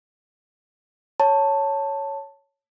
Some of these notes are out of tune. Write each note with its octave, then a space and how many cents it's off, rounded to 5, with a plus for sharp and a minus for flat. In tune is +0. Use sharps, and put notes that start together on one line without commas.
C#5 +0 A5 +10